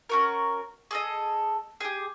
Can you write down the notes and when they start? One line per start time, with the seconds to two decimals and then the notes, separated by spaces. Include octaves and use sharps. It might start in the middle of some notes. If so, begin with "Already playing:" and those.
0.09 C#4 F#4 A#4
0.91 G#4 A4 D#5
1.80 G4 G#4